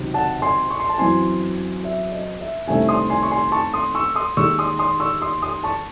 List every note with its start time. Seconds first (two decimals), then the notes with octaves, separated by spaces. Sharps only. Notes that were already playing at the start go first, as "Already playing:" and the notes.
Already playing: C#2 C3 D#3 F#3
0.14 F#5 A5
0.42 G#5 C6
0.70 C#6
0.80 C6
0.89 A5
0.98 F#2 E3 C4 G#5 C6
1.83 E5
2.12 D#5
2.40 E5
2.68 C2 C3 D#3 A3 C#4 E5 G#5
2.88 C6 D#6
3.10 G#5 C6
3.23 C#6
3.31 G#5 C6
3.52 A5 C#6
3.73 C6 D#6
3.95 C#6 E6
4.15 C6 D#6
4.37 D#2 D#3 G#3 D#4 C#6 E6
4.58 C6 D#6
4.79 C6 D#6
5.00 C#6 E6
5.22 C6 D#6
5.42 C6 D#6
5.63 A5 C#6